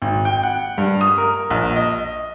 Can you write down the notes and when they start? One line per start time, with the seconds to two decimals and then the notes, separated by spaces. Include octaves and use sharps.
0.02 G#1
0.25 G5
0.43 F#5
0.78 G2
1.01 D#6
1.18 A#4
1.51 A#1
1.76 D#5